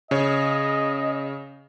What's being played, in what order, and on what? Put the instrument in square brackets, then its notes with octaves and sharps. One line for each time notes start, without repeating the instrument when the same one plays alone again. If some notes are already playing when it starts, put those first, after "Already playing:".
[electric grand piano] C#3 C#5 [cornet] D#5